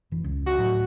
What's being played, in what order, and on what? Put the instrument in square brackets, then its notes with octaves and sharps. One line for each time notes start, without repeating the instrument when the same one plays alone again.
[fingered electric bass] F1 E3
C#2
[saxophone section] F#4
[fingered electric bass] A2 F#3